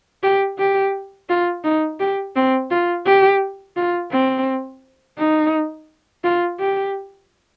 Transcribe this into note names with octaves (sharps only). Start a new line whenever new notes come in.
G4
G4
F4
D#4
G4
C4
F4
G4
F4
C4
D#4
F4
G4